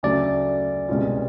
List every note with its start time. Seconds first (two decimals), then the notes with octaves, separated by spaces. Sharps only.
0.03 D2 C#3 F#3 A3 D4 D5
0.88 C2 B2 G#3 C#4 F4